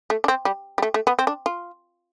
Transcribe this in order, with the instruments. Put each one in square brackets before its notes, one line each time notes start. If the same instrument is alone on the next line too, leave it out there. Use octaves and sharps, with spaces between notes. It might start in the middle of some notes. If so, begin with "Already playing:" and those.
[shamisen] A3
D4
C4
G3
G3
A3
A3
B3
C4
D4
F4